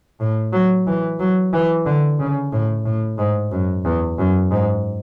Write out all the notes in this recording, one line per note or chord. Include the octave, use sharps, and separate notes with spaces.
A2
F#3
E3
F#3
E3
D3
C#3
A2
A2
G#2
F#2
E2
F#2
G#2